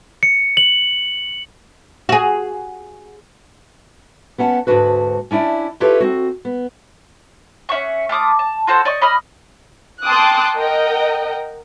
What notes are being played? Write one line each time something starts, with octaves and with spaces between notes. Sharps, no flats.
C#7
F#7
F#4 G#4
B3 C#4 F#5 A5
D2 G#2 D#3 D4 F#4 B4
C#4 D4 E4 D5
E4 F4 G4 A4 B4 C#5
C4 C#4 F#4
B3
C#4 E5 F#5 C#6
A3 F4 D6 D#6
A5
F4 F#4 A4 C5
D5 D#5 C#6
D#5 B5 D#6 F6
G5 A5 C6 D6 D#6 F#6
A#4 D#5 F#5 G5